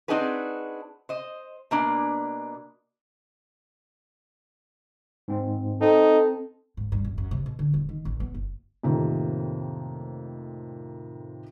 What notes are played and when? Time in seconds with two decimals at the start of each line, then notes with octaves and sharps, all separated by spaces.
0.08 C4 D4 D#4 F#4 G#4 B4
1.09 C5 D#5
1.71 B2 A#3 D4
5.28 G#2 C4
5.81 C4 D#4 A4
6.77 G#2
6.92 G2
7.04 F#2
7.18 F#2
7.31 C3
7.46 B2
7.59 D3
7.74 D#1
7.89 D#3
8.05 A1
8.20 B3
8.34 F#1
8.83 F2 A2 C3 D#3 A#3